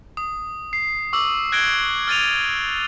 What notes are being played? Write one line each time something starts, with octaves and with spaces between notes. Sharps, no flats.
D#6
C7
C#6 D6 E6
F#6 G#6 A#6 D7 G7
F6 A6 D#7 F7